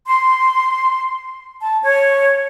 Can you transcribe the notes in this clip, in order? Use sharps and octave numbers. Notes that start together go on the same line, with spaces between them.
C6
A5
C#5